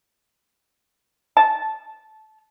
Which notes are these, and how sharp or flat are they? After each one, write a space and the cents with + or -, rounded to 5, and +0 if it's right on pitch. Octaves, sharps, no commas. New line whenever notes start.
A5 -15